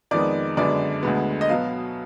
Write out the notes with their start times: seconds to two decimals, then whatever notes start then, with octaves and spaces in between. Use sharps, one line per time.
0.11 F2 D#3 G#3 B3 D5
0.57 F#2 D3 G#3 B3 D5
1.03 D2 D3 G#3 B3
1.41 D#5
1.49 B2 F#3 B3 F5